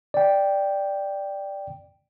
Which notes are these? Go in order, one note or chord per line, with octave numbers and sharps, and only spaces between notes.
D5 G5